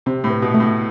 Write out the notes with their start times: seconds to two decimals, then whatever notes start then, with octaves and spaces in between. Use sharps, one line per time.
0.06 C3 C4
0.24 A2
0.30 B4
0.42 B2
0.54 A3
0.60 A2